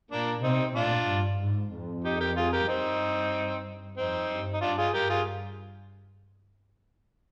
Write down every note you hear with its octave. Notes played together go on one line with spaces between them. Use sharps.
A#2 A#3 D4
C3 C4 D#4
A#2 D4 F4
G2
G#2
F2
D#4 G4
G4 A#4
F4 G#4
G4 A#4
G2 C4 D#4
F2 C4 D#4
G2
D#4
G2 D4 F4
F4 G#4
G2 G4 A#4
F4 G#4